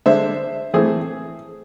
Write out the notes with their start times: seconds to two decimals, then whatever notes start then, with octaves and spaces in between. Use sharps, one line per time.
0.06 D3 G#3 D4 C5 E5
0.73 E3 A3 C4 G#4